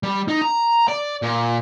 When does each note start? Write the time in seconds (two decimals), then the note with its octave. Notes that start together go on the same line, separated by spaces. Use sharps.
0.03 G3
0.28 D#4
0.42 A#5
0.88 D5
1.22 A#2